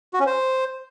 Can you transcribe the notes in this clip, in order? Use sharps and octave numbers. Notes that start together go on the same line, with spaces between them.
F#4
C#4
C5